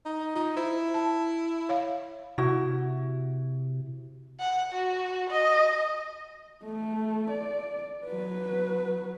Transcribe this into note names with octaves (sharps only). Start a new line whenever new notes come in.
D#4
D#4 F4
E4 C5
A5
C#5 F5
C3 E4 F#4
F#5
F#4
D#5
A3
D5
F#3 B4